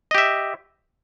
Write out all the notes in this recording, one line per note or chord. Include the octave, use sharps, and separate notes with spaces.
G4 D#5 E5